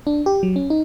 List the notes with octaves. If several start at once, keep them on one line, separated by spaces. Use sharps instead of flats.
D4
G4
F#3
C#4
D#4